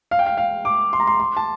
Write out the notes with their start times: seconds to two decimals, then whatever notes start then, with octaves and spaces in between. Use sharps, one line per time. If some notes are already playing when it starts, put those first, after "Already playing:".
0.11 F5
0.19 G5
0.26 F5
0.37 F5
0.65 D6
0.93 C6
1.00 A#5
1.07 C6
1.20 C6
1.37 A5